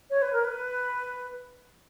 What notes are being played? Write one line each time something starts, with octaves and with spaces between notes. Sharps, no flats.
C#5
B4
A#4
B4